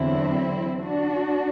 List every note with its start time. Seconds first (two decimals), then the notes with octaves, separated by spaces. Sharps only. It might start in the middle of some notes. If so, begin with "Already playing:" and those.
Already playing: E2 D3 F#3 C4 E4
0.82 D4 F#4